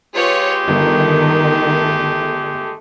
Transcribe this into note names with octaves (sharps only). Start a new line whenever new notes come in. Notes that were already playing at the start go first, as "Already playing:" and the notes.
G#3 F4 G4 B4 C#5
G1 D#3 A3